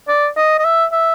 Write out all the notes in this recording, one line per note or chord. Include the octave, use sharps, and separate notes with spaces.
D5
D#5
D#5
E5
E5